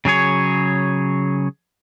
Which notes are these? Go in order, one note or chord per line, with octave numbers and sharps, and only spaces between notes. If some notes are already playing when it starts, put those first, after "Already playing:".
C#3 F#3 G#4 C#5